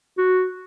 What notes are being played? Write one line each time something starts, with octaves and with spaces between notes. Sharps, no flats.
F#4